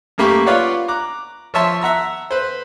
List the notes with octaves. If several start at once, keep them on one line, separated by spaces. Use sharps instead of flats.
F#2 A3 A#3 G4 B5 C#6
F4 B4 C#5 D5 F5 F#5
A#5 D6 F#6
F3 C#5 E5 A5 C6
E5 F#5 A#5 E6
B4 C5